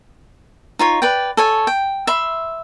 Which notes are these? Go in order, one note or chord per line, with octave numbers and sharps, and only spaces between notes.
D#4 F4 C#5
B4 D5 G5
A4 C#5 G#5
G5
E5 B5 C6